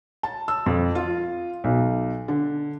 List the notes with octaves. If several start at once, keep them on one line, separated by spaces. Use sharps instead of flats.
A5
E6
F2
F4
B1
D3